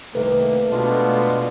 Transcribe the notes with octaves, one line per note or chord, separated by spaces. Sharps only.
C2 C3 D#3 A3 A#3 B4
B2 G#3 D4 F4